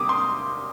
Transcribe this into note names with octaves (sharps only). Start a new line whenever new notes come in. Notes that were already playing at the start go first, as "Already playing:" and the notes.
Already playing: C3 G3 A#3 D6 D#6
C6